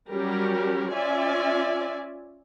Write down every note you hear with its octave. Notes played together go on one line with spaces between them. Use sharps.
F#3 G3 C#4 G4 A#4
C#4 F4 D5 E5 G#5